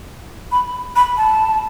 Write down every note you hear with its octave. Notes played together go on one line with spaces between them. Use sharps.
B5
B5
A5